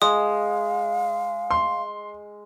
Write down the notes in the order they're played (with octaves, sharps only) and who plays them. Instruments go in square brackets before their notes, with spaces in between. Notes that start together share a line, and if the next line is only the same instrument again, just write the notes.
[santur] G#3 [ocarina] F5 [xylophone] D#6
[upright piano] C6